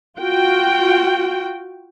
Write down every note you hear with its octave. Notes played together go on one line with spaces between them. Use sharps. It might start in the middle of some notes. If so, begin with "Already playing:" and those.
F4 F#4 G5